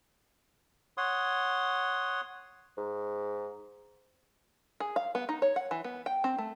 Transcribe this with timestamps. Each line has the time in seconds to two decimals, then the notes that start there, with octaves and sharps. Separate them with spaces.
0.97 C#5 F#5 C6 D#6
2.78 G#2
4.80 G#4
4.96 F5
5.15 B3
5.29 D#4
5.42 C#5
5.56 F#5
5.71 E3
5.84 B3
6.06 G5
6.24 C4
6.38 A3